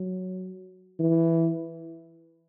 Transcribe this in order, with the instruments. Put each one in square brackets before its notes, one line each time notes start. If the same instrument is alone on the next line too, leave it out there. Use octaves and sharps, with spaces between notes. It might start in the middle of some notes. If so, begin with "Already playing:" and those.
Already playing: [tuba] F#3
E3